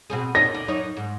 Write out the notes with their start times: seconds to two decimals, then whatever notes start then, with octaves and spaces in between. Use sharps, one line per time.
0.10 B2 C4 G#4
0.35 A#2 C#4 D#4 A#6
0.54 D2 D3
0.68 F#2 D#4 C#5
0.97 G#2